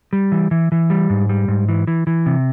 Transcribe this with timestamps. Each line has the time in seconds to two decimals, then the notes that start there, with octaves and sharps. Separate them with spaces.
0.13 G3
0.32 E3
0.51 E3
0.72 E3
0.90 G3
1.10 G#2
1.29 G3
1.48 G#2
1.69 E3
1.87 E3
2.07 E3
2.26 C3